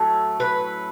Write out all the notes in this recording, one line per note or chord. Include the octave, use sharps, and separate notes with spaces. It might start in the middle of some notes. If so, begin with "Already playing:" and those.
Already playing: A2 F#3 A3 C#4 A4
B4